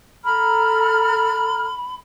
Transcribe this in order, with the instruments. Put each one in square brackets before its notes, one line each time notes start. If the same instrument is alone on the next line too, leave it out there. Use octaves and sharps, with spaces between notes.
[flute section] A4 A#5 F6 [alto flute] B5